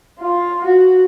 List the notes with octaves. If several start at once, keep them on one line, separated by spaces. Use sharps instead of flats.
F4
F#4